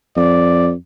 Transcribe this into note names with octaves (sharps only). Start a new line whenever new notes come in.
F2 D5